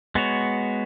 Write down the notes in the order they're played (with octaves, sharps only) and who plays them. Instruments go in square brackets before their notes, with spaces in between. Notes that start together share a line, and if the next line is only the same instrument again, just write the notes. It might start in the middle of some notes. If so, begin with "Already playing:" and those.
[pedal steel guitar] G#3 B3 F#4 C#5